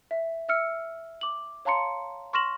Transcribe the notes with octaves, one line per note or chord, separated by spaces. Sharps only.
E5
E5 E6 F6 C#7
D6 F#7
C#5 F5 A5 A#5 C6 C#7
C6 C#6 F6 A#6 E7 F#7